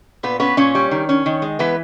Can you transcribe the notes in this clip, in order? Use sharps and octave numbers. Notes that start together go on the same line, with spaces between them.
A#2 B3 B4
B3 C#4 B4
A#2 C#4 C#5
G3
D#3
C#4
D#3
G#3
E3 B3 B4